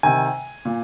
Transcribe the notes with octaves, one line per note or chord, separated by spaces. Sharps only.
C3 D#3 G#5
A#2